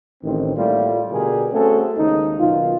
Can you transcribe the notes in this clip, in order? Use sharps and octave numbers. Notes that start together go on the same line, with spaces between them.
A1 D#3 C4
A2 G3 A3 A#3 F4
B2 D3 G3 G4 G#4 A#4
A3 C4 C#4 F#4 G#4 A4
D#2 C#3 G#3 D#4
F#2 B2 D#3 F4